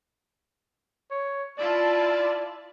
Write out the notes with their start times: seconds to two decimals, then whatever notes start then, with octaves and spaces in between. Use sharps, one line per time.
1.11 C#5
1.58 E4 F4 D5 A5